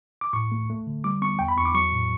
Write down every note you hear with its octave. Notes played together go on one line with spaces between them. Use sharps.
D6
A2 C#6
A3
A3
D3
G3 D6
B3 C#6
E2 G5
B5
E2 C#6
D6
F#3 C#6
A2